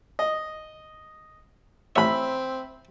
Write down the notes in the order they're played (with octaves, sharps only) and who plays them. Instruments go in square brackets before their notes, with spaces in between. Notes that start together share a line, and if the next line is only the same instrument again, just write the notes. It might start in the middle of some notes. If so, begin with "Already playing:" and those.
[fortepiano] D#5
[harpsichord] A1 C#5 [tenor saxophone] C4 [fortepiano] E5 B5